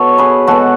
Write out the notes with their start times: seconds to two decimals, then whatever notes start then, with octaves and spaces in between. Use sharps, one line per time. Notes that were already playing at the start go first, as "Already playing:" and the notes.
Already playing: B2 A4 C#5
0.18 G#4 B4
0.47 B2 G#3 F#4 A4